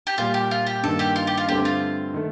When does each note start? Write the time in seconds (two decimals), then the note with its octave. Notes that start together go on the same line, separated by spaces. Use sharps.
0.07 G4
0.18 A#2 G3 A#3 F4
0.34 G4
0.51 F4
0.66 G4
0.83 G2 D#3 A#3 A4
0.99 G4
1.16 F4
1.27 G4
1.38 F4
1.48 G2 D3 A3 C4 G4
1.65 F4
2.14 D#3 A3